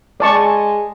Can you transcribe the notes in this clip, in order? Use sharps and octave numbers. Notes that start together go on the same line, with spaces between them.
G#3 D5 A5 C#6